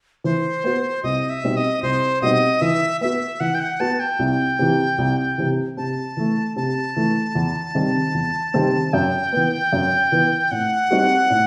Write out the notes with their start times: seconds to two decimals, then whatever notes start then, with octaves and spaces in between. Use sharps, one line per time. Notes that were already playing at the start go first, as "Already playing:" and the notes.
0.24 E3 C5
0.64 B3 F#4
1.03 C2 D#5
1.30 E5
1.44 B2 G3 C4 D#4
1.57 D#5
1.83 C2 C5
2.22 B2 G3 C4 D#4 D#5
2.62 E3 E5
3.01 B3 F#4 E5
3.40 E3 F#5
3.55 G5
3.60 F#5
3.80 B3 F#4 A5
4.00 G5
4.19 C2
4.59 C3 E3
4.98 C2
5.38 C3 E3
5.77 C3 A5
6.17 E3 A3
6.56 C3 A5
6.96 E3 A3
7.35 E2
7.75 C3 D#3 G3 C4
8.14 E2
8.54 C3 D#3 G3 C4
8.93 F#2 G5
9.33 E3 B3
9.73 F#2
10.12 E3 B3
10.51 A2 F#5
10.91 G3 C4 D#4 F#4
11.30 A2